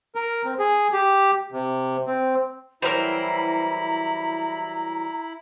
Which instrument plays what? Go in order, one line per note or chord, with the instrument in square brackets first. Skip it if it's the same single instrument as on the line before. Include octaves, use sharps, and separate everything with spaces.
[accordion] A#4
C4
G#4
G4
C3
C4
[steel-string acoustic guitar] E3 F#3 G3 [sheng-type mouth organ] E4 B5 [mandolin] A#4 C5 [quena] A#5